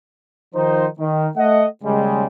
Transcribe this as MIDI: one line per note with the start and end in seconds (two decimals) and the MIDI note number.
0.55 0.87 51
0.55 0.87 53
0.55 0.87 63
0.55 0.87 72
0.99 1.27 51
1.36 1.65 57
1.36 1.65 75
1.36 1.65 78
1.84 2.27 39
1.84 2.27 49
1.84 2.27 55
1.84 2.27 56